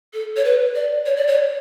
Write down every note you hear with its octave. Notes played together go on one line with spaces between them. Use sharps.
A4
C#5
B4
D5
C#5
D5
C#5